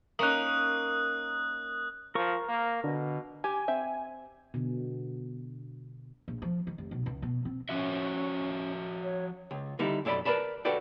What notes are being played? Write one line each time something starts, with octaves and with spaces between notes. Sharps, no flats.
A#3 C#4 D#4 D#6 F#6
F3 A#4 C#6
A#3
B2 D3
G4 G#5
C4 E5
B2 D3
A#1
F3
D#3
F1
B1
C#2
B2
C4
F3 C#4 F#4 E5
C#5
C#2
D3 G3 D#4 E4
B1 F#2 A4 D5 B5
A#4 B4 D5 A5 B5
F#4 A4 B4 D5 G5